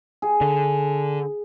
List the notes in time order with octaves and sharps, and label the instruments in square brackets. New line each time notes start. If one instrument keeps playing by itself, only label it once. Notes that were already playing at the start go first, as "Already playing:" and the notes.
[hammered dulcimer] G#4
[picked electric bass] D3